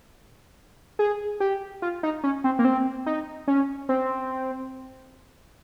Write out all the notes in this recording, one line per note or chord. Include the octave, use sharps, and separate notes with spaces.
G#4
G4
F4
D#4
C#4
C4
A#3
C4
D#4
C#4
C4